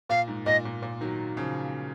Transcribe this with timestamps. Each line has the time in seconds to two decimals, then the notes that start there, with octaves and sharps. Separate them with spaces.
0.10 A#2 F5
0.28 G#2
0.46 A#2 D#5
0.65 A#2
0.82 A#2
1.01 D#3 F#3
1.37 C#3 F3